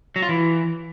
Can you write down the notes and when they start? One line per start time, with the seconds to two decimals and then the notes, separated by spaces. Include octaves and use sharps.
0.16 F#3
0.22 F4
0.29 E3